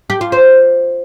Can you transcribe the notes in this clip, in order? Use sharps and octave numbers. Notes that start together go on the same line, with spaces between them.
G4
F4
C5